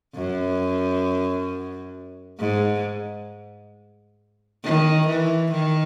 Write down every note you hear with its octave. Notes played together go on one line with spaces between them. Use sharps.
F#2
G#2
D#3
E3
D#3